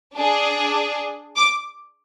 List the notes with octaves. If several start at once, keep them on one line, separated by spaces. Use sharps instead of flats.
D4 G#4
D6